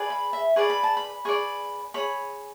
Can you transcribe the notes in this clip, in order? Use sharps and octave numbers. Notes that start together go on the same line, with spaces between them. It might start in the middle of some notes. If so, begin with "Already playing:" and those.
Already playing: G#4 B4 D5
B5
E5
G#4 B4 D5 C#6
B5
A5
B5
G#4 B4 D5 C#6
G#4 C#5 B5